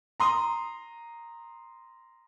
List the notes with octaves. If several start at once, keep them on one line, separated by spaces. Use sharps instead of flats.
A#5 C6 D#6